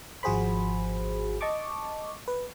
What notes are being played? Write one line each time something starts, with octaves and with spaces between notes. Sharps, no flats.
G#1 F3 F#4 G#4 C5 B5
D#5 A5 C#6 D6
B4